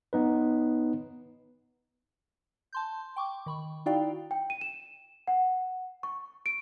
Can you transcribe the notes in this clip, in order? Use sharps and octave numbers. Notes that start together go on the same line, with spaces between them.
B3 D#4 B4
A5 C6 G6
G5 C#6 D6
D#3 B5 C#6
D#4 E4 F#4 D5 F5 G5
G5
D#7
E7
F#5
C#6
D7